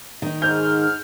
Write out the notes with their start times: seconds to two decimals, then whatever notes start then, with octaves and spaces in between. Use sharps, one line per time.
0.22 D#3 D#4
0.42 G#2 F6 G6